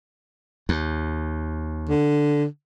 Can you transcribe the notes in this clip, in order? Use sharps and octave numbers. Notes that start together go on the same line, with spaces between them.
D#2
D3